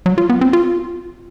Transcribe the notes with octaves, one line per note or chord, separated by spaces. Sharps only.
F#3
F4
B3
C4
F4